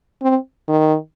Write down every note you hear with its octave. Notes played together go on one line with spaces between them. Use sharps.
C4
D#3